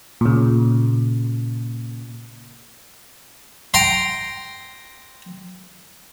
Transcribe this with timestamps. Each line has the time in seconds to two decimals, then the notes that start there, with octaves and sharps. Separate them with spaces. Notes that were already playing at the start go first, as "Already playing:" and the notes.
0.21 A#2 C#3
3.74 G5 A#5 C6